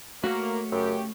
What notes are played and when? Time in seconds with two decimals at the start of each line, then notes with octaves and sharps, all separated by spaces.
0.24 A3 A#3 F#4 C#5 F6
0.72 F#2 C#3 G4